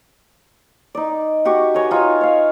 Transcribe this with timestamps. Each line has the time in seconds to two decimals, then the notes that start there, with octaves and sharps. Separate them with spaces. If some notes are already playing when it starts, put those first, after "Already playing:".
0.95 D#4 D5
1.45 F#4 G4 F#5 C#6
1.74 B4 C#5 D#5 G#5
1.91 D#4 F4 G#5
2.21 C#5 F5